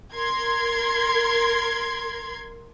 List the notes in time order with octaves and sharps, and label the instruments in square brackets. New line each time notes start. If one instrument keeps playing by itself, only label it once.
[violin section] A#4 C6 G#6